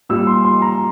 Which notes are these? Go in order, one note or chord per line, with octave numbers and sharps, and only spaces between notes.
A#2 G3 E6
C6
C6
A#5